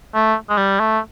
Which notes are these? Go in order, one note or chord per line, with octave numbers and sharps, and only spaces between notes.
A3
G#3
G3
A3